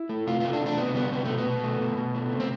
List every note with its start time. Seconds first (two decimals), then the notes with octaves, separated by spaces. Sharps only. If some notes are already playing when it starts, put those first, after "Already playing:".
Already playing: E4
0.09 A3
0.27 C3 F4
0.40 A3 F4
0.53 D4
0.61 C3
0.66 D4
0.78 C3 B3
0.95 G3 B3
1.12 C3 B3
1.25 B2 A3
1.38 B3
1.46 B2
1.64 A3
1.80 B2
1.97 B2
2.15 A3
2.32 C3
2.40 C4